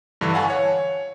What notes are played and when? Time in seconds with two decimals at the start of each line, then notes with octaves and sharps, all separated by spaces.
0.21 G2 D3 E3
0.34 F5 F#5 G#5 A5 C#6
0.50 C#5